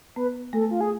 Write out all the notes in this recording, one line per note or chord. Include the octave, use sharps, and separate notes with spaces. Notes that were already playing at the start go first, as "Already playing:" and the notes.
B3 B4
A3 A4
F4
G#4